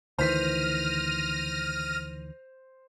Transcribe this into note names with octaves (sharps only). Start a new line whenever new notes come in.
D2 D#3 E3 C5 F6 A#6 B6 D#7